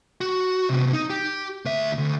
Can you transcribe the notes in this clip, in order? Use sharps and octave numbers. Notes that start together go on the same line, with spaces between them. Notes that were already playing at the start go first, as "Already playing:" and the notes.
F#4
C3 B3
D#4
G4
D2 E5
D2